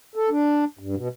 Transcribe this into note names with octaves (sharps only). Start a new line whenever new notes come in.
A4
D4
G2
B2